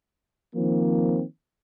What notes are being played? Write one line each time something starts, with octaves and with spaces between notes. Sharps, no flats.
D#3 F3 A#3 C4